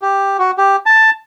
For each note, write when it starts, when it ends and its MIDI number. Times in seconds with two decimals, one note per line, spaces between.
0.02 0.37 67
0.39 0.51 66
0.58 0.76 67
0.86 1.10 81